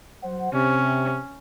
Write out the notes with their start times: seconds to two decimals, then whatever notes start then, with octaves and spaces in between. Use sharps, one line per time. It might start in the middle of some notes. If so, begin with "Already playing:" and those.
0.22 F#3 C5 F#5
0.53 C3 C#4